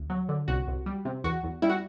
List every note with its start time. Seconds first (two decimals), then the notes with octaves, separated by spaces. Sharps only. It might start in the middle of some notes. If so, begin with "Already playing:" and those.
Already playing: D2
0.10 F#3
0.29 D3
0.48 C2 F#4
0.67 C2
0.86 G3
1.05 C3
1.24 E2 F#4
1.43 E2
1.62 G3 E4
1.69 F#4